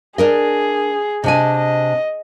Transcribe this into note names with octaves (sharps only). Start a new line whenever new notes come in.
D4 G#4 A#4 D#5
C3 D4 D#5 G#5
D#5